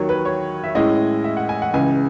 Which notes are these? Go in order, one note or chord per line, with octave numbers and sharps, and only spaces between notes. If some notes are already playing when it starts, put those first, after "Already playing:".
Already playing: D#2 D#3 F#3 C#5
B4
C#5
E5
A2 G#3 C#4 E4 D#5
E5
F#5
G#5
F#5
C#2 C#3 E3 G#5